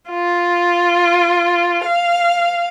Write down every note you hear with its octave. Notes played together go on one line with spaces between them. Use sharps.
F4
F5